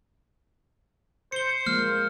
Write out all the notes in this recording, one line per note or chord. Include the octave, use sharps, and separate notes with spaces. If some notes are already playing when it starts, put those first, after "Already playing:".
C5 C#7 G7
F3 G#3 A#3 F6